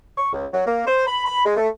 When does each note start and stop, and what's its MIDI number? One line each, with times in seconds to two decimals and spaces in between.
0.17 0.30 85
0.33 0.45 37
0.53 0.63 54
0.66 0.82 58
0.86 1.05 72
1.07 1.22 83
1.26 1.42 83
1.45 1.53 56
1.57 1.68 57